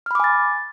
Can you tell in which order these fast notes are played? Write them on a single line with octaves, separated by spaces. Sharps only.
F6 B5 D6 G#5 A6